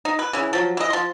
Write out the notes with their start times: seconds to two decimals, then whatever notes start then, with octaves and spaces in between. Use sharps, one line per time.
0.05 D#4
0.19 B4
0.33 C#3 E3
0.53 F3 F#3
0.77 E3 D#5
0.90 F3 C6